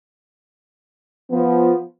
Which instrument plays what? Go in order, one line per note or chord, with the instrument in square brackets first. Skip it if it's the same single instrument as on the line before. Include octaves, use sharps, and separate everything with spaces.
[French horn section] F3 B3